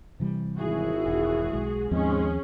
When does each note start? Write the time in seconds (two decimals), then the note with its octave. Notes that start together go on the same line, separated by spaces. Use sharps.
0.20 C3 E3 G3
0.57 G#1 E4 F#4 G#4
1.06 E1
1.53 B1 G#3
1.91 D#2 G#2 F3 G#3 C4 C#4 G#4